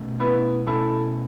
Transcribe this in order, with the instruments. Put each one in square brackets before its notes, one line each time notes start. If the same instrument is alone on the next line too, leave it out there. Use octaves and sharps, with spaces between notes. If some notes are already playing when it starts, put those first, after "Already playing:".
Already playing: [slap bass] B2 A3 C#4
[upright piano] B3 E4
[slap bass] B2 A3 C#4 [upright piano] E4 A4